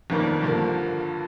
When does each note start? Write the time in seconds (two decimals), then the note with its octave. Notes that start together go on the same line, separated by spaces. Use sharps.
0.10 G1 F2 D#3 A#3 D4
0.42 G2 D3 F3 A#3